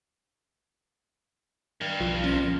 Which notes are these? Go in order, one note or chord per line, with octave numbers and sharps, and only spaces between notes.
G2 D#3 G5
B1 F3
C4 C#4 C5 A#6
A#2 D3 F3